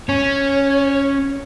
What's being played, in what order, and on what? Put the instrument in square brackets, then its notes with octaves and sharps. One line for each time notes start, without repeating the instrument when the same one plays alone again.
[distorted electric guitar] C#4 [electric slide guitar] C#5